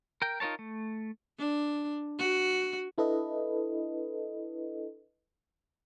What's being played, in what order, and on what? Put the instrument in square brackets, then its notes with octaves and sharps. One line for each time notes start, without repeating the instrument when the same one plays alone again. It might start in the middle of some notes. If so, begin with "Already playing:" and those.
[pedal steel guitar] A#4 G5
D#4 F4 A#4 C#5 A5
A3
[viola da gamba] D4
F#4
[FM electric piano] D4 E4 A4 B4 D#5